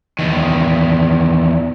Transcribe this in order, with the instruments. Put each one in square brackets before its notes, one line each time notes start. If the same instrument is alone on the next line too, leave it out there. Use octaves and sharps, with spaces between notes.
[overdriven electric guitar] E2 D#3